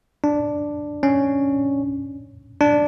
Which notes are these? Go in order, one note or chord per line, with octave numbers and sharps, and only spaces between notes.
D4
C#4
D4